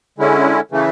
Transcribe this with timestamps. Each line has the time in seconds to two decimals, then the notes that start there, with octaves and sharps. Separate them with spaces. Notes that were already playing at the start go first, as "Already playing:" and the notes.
0.18 D3 G#3 C#4 E4
0.71 C#3 E3 A3